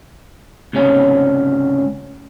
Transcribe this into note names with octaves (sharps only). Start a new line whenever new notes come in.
C#2 G#2 C3 C#4